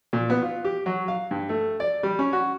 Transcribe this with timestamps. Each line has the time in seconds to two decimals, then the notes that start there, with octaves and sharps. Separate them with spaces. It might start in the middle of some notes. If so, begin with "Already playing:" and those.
0.13 A#2
0.30 B3
0.42 F4
0.65 G4
0.86 F#3
1.08 F5
1.31 G2
1.49 A3
1.80 D5
2.03 G3
2.19 C#4
2.33 F#4